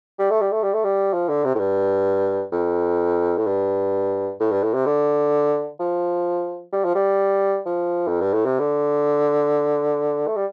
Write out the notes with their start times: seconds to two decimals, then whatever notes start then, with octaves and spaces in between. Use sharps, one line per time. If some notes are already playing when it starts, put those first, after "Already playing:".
0.19 G3
0.30 A3
0.41 G3
0.52 A3
0.63 G3
0.73 A3
0.84 G3
1.13 F3
1.28 D3
1.44 C3
1.55 A2
1.59 G2
2.52 F2
3.37 A2
3.46 G2
4.40 A2
4.51 G2
4.63 A2
4.74 C3
4.86 D3
5.80 F3
6.73 G3
6.84 F3
6.95 G3
7.66 F3
8.07 F2
8.21 G2
8.33 A2
8.46 C3
8.59 D3
10.27 A3
10.36 G3